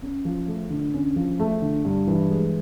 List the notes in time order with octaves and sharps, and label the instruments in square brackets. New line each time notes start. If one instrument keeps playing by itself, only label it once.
[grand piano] C#4
F3
A3
D3
C#4
F3
A3
D3
G2
E3
G#3